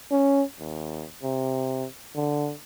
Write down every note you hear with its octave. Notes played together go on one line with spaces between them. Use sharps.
C#4
D#2
C3
D3